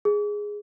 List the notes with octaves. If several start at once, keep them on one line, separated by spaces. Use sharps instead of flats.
G#4